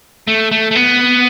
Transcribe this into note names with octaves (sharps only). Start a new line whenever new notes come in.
A3
A3
A3
B3